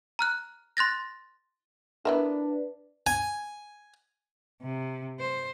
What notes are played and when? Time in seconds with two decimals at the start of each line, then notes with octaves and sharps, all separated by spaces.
0.19 A#5 F6 F#6
0.77 C6 F#6 A6 A#6
2.05 E3 B3 D4 A#4 B4 D5 E5
3.07 G#5
4.62 C3
5.20 C5